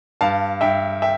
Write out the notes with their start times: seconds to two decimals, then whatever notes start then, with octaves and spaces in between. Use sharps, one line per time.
0.21 G2 F5 A5
0.61 G2 E5 G5
1.02 E5 G5